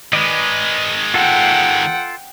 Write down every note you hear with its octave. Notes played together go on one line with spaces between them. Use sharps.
D#3 G#3 B4 D5 D#5
F4 A4 F#5 G5